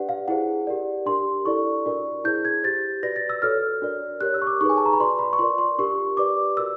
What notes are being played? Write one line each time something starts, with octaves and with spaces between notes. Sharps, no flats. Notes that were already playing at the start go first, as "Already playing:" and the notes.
Already playing: D4 G4 B4 D5 F#5
F5
E4 G#4 C5 F#5
G4 A#4 D5
D4 G4 A#4 C6
E4 A4 D5 C#6
D4 F#4 A#4 D5
E4 G#4 C5 G6
G#6
G4 C5 A6
F#4 B4 D5 A#6
A6
E6
F#4 A4 C#5 F6
D4 F#4 A#4 D5
G4 A#4 C#5 F#6
E6
C#6
D6
D#4 G#4 B4 C#6
G#5
A5
A#5
B5
F#4 B4 D5 C6
B5
C#6
F4 A#4 D5 C6
C6
D4 G4 A#4 C#6
G4 B4 D5 D6
F#4 A#4 D5 E6